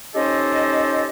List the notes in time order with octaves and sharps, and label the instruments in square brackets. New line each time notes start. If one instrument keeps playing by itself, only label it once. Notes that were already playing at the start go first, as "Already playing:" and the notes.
[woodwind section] C#4 D#4 G4 A4 C5 D#5